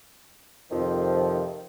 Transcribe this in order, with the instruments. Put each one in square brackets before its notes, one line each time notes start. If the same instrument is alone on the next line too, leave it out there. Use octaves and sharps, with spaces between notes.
[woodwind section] F2 C3 D#3 F3